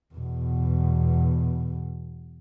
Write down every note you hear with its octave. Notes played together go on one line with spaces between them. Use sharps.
E2 B2